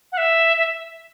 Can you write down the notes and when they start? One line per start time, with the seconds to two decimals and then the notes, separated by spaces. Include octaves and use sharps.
0.12 F#5
0.17 E5
0.57 E5